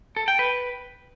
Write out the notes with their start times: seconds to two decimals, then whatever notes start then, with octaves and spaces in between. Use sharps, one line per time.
0.17 A4
0.28 G5
0.39 B4